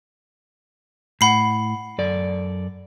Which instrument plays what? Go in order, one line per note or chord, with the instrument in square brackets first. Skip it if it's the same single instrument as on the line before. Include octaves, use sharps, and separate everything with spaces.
[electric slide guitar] A2 [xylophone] F#5 B5 C7
[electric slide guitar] F#2 A4 D5